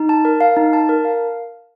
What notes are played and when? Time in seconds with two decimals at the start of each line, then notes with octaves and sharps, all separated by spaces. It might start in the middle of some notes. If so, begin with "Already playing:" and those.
Already playing: D#4
0.09 A5
0.25 A#4
0.41 F5
0.56 D#4
0.73 A5
0.89 A#4
1.05 F5